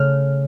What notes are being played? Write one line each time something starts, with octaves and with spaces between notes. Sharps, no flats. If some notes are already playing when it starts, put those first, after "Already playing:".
Already playing: C#3 A3 F6